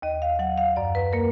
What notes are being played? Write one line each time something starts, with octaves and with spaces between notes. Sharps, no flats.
D#2 D#5
F5
F#3 F#5
F5
F#2 D5
B4
A#3 A#4